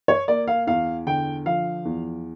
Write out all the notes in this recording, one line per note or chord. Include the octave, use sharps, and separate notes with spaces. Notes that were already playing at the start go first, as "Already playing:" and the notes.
C#5
A#3 D5
F5
E2 F5
D3 G5
F3 F5
E2